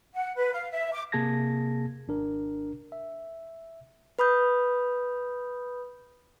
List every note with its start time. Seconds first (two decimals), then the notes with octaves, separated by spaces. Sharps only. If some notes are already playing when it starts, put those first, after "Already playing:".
0.14 F#5
0.36 B4
0.53 F5
0.71 E5
0.92 D6
1.12 C3 A#3 G#4 A5 G#6 A#6
2.08 G#1 D4 A#4
2.92 E5
4.19 B4 B5 D#6 G6